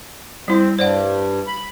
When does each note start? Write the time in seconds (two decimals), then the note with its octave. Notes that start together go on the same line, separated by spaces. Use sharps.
0.48 G3 C4 E4
0.79 G2 C5 D5 F#5
1.47 B5